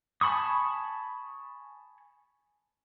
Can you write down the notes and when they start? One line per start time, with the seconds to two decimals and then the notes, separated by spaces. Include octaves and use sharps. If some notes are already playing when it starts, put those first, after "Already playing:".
0.21 G#5 A5 B5 C#6 D#6